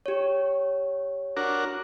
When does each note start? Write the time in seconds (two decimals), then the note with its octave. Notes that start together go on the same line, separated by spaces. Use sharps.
0.06 G4 C#5
1.37 D4 F#4 A#4